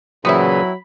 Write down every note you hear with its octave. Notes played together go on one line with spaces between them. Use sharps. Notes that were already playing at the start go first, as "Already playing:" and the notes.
A#2 C#3 E3 F#3 B3 C4 E4 B5